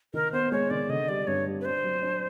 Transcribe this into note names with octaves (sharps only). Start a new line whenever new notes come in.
D#3 A#4
B3 C5
G#3 C#5
D#3 D5
D3 D#5
G3 D5
G2 C#5
G3
B4
D4 C5
F#3
D4